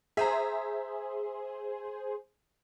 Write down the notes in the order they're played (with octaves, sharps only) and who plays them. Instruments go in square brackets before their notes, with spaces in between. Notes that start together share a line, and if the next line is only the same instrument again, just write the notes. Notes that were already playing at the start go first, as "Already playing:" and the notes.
[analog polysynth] G#4 C5 [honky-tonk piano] E5 A#5